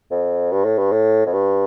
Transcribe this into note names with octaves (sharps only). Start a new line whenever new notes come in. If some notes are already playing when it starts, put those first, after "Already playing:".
F2
G2
A2
G2
A2
F2
G2